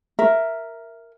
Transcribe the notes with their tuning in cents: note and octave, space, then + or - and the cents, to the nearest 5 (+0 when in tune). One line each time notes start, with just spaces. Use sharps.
A#4 +0 E5 +0